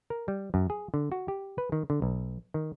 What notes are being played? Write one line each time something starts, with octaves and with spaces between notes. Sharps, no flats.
A#4
G3
F#2
G#4
D3
F#4
G4
B4
D#3
D3
B1
D#3